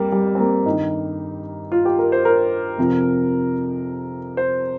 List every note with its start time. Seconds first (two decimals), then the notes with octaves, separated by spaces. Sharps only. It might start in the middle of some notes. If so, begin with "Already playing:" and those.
Already playing: F2 G3 A#3 G4
0.12 G3
0.35 C4
0.39 A#3
0.65 G2 D#3 D#4
1.72 F4
1.85 G4
1.99 A#4
2.12 C5
2.25 A#4
2.78 F2 C3 F3
4.37 C5